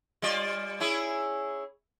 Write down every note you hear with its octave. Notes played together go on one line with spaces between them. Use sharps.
G3 F4 D5
C#4 E4 G#4